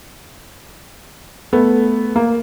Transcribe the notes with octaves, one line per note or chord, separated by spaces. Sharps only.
A3 B3
A#3